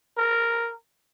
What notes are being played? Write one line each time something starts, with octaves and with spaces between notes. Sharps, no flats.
A#4